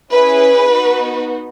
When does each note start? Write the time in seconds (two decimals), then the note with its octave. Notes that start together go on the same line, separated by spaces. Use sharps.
0.12 C#4 E4 G#4 B4
0.72 B3 D#4 F#4